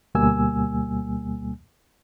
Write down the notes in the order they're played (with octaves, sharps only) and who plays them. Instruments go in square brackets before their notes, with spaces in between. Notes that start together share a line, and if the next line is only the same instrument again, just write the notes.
[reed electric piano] D2 B2 G3 A#3 G#5 E6